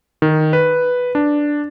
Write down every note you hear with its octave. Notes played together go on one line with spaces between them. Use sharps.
D#3
B4
D4